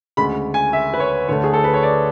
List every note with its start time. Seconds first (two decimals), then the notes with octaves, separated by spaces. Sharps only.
0.17 D2 C#3 G#3 B5
0.54 G#5
0.73 E5
0.94 B4
1.00 C#5
1.28 D2 D3 A3 C#5
1.44 G#4
1.53 A4
1.64 B4
1.74 C#5
1.83 D5